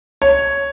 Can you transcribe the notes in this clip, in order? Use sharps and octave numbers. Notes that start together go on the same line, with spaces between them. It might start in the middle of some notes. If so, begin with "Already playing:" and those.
C#5